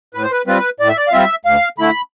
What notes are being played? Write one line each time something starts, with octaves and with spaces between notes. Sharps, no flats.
A2 B4
C5
B4
G3 C4 F4 B4
A2 D5
E5
D5
F5
G3 C4 F4 E5
D2 F5
D3 A3 E4 B5